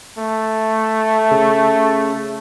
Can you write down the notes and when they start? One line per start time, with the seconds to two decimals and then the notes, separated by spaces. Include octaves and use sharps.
0.18 A3
1.31 C#3